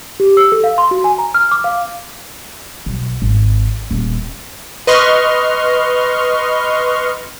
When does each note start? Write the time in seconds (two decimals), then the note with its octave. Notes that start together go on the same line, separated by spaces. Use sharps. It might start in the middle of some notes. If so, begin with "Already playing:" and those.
0.20 G4
0.37 E6
0.52 A4
0.64 F5
0.78 C6
0.91 F#4
1.04 G#5
1.18 A#5
1.35 F6
1.52 D6
1.64 F5
2.86 B1
3.22 G#1
3.91 D#1
4.87 B4 D#5 C6 C#6 F6